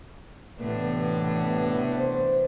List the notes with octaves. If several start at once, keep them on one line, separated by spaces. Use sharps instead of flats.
A2 C3 E3 A3 B3 D4
C5